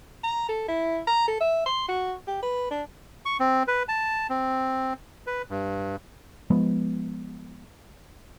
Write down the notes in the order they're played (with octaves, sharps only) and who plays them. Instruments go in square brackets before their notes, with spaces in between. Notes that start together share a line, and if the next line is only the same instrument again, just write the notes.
[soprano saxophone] A#5
A4
E4
A#5
A4
E5
C6
F#4
G4
B4
D4
[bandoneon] C#6
C4
B4
A5
C4
B4
G2
[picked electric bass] F3 G#3 B3